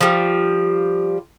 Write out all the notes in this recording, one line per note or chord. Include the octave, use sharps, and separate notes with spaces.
F3 G3